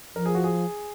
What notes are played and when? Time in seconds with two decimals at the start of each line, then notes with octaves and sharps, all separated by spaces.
0.15 F3 A#4
0.26 G#4
0.35 F#4
0.44 G#4